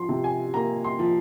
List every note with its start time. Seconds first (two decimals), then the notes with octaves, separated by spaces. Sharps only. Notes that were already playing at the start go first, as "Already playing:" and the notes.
Already playing: F3 C6
0.09 C3
0.24 G#5
0.54 A#3 A#5
0.84 C6
0.99 F3